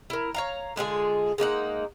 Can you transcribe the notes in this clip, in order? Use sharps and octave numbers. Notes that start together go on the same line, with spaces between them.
E4 A#4
C#5 F5 A#5
D3 G#3 F4 G#4
G#3 A#3 D#4 F#5